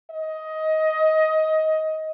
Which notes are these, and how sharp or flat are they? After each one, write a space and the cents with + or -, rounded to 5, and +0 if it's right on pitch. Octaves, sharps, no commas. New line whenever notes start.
D#5 +15